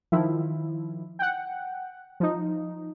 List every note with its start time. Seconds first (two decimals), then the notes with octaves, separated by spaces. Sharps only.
0.12 D#3 F3 E4
1.19 F#5 G5
2.20 F3 D#4